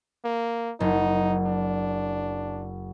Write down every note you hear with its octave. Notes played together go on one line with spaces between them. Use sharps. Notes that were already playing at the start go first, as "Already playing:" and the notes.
A#3
F#1 D#4
D4